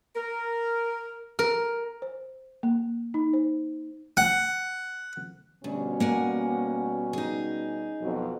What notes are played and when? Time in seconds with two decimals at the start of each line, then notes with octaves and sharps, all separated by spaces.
0.16 A#4
1.39 A#4
2.02 C5
2.63 A#3
3.14 D#4
3.33 C5
4.17 F#5
5.64 D2 B2 G3 C#4
6.00 A#3 F#5 G#5
7.13 D#4 G#4
8.01 F2 B2 F#3